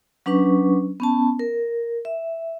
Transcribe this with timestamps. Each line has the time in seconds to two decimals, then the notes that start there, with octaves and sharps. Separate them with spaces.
0.26 F#3 C#4 D4 B4 C#6
1.00 B3 C#4 A5
1.39 A#4
2.05 E5